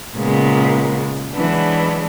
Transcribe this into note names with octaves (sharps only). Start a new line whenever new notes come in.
A#2 C#3 G#3 A#3 B3
E3 F#3 G#3 B3 D4